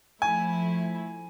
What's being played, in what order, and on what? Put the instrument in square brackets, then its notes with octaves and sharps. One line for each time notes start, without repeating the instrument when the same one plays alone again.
[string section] F3 A3 E4 [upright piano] G#5